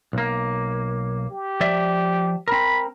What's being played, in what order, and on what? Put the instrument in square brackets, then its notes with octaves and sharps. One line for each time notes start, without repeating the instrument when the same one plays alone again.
[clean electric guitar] B1 A#3
[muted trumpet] G4
[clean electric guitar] F3 D5 E5
[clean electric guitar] C4 A#4 [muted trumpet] B5